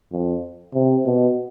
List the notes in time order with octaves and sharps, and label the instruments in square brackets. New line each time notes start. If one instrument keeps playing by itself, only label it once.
[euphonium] F2
C3
B2